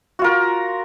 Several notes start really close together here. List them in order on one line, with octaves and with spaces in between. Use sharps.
F#4 F4 A#4